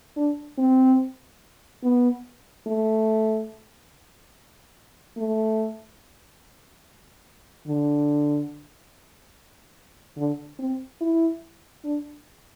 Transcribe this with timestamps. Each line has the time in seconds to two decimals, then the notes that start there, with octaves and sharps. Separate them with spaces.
0.17 D4
0.58 C4
1.84 B3
2.67 A3
5.17 A3
7.68 D3
10.18 D3
10.59 C4
11.01 E4
11.84 D4